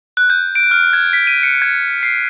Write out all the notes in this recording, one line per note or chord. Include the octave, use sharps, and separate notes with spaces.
F#6
G6
D7
F6
G#6
B6
D#7
C#7
G#6
C7